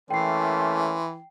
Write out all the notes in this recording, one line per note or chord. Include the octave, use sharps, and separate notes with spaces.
E3 A3 A#3 C#4 G5 C6 C7